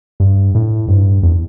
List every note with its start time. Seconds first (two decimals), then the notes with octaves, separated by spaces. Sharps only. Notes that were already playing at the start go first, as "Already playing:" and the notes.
0.20 G2
0.55 A2
0.88 G2
1.23 E2